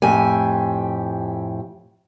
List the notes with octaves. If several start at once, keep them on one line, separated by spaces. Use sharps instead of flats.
F2 A2 G4 G#5